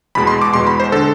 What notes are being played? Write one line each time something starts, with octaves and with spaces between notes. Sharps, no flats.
E2 B2 G#3 B5
C6
D6
E2 B2 G#3 C6
B5
C5
D3 G#3 A4